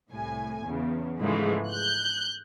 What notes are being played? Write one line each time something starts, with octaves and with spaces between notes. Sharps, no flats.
C2 A2 G#5
E2 C#3
G#2 C#3 E3 F3 G#3 A3
F#6 G6